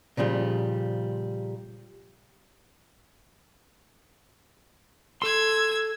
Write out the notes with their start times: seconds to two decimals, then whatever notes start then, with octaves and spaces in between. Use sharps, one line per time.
0.17 A#2 C#3 F3 G3
5.22 A4 C6 E6 G#6